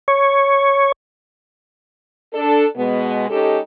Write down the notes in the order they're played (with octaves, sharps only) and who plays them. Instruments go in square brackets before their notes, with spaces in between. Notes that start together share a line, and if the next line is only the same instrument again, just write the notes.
[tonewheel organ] C#5
[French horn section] D4 A4
B2 G#3 B3
G#3 C#4 D#4 G4 A4